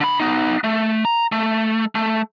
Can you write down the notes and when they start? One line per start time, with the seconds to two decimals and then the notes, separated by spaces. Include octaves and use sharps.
0.01 D3 B5
0.20 B3 D#4
0.64 A3
1.05 A#5
1.32 A3
1.95 A3